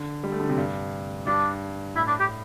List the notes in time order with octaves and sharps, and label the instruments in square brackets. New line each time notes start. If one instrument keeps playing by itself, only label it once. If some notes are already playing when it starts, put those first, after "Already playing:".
Already playing: [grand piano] D3
G3
A3
D3
C3
G2
[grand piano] G2 [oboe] D4
[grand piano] A2 [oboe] E4
[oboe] D4
G4